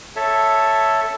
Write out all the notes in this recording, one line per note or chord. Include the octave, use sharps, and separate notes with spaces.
A4 C#5 E5 A5